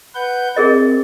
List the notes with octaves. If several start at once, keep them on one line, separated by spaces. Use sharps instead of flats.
B4 F#5 G6
C4 G#4 A#4 D#5